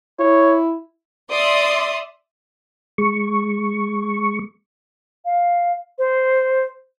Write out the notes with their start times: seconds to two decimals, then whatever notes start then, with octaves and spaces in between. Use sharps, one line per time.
0.19 E4 C#5
1.32 D5 E5 C6 D#6
2.98 G#3 C#6
5.25 F5
5.99 C5